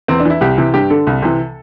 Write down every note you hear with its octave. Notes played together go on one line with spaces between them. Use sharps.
E2 C4
D4
E3 E4
C2 G4
C3 E3
G2 G4
D3 A4
C2
C3 E3